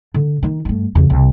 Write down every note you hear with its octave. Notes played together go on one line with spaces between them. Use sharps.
D3
D#3 D#4
G2 A3
E2 C#3
C2